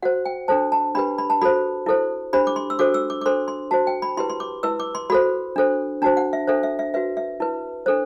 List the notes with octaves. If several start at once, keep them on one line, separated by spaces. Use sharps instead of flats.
F#4 C5 F#5
G5
D4 A4 C5 A5
A5
D4 G4 B4 B5
B5
A5
F#4 A4 C5 B5
E4 A4 C5
D4 G4 C5 B5
D6
C6
E6
D4 F#4 A4 C5 D6
E6
D6
D6
D4 A4 C5 C6
C6
F#4 C5 A5
G5
B5
E4 G4 B4 C6
C6
D6
E4 B4 E6
D6
C6
F#4 A4 C5 B5
D4 A4 C5
D4 F#4 C5 A5
F#5
E5
D4 A4 C5 E5
E5
E5
F#4 B4 E5
E5
E4 B4
D4 A4 C5